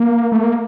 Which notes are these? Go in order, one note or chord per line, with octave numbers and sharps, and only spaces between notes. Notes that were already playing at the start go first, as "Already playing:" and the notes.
Already playing: A#3
A3
A#3